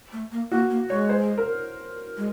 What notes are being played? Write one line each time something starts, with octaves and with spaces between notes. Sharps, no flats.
A3
A#3
A#3 F#4
A#3
G#3 C#5
C5
A#4
G#3